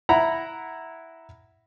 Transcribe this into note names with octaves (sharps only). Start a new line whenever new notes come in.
E4 F#5 A#5 B5